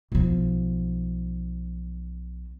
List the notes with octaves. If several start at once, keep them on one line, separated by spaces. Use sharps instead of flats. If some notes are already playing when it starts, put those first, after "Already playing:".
B1 F3